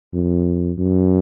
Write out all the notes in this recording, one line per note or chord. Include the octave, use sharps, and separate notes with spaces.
F2
F#2